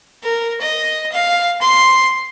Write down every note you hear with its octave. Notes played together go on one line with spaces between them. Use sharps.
A#4
D#5
F5
C6